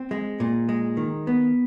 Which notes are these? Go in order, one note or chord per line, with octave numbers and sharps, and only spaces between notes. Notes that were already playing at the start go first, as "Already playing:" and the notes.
Already playing: C4
G#3
A#2
G#3
D#3
B3